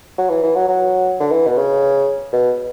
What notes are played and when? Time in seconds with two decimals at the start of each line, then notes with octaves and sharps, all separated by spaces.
0.18 F#3
0.30 E3
0.43 E3
0.56 F#3
0.68 F#3
1.20 D3
1.31 E3
1.47 B2
1.57 C#3
2.33 B2